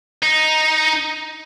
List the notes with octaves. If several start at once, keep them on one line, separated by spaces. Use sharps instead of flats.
D#4